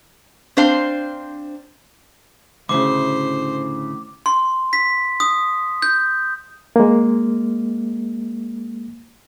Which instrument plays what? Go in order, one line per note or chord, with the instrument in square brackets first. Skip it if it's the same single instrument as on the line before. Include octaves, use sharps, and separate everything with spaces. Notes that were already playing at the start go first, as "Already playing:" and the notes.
[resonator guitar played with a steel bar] C4 D4 C5 F5
[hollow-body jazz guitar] D2 A2 [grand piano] C#3 C6 [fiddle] C5 [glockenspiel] D6
[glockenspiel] C6
B6
D#6
G6
[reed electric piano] G#3 A#3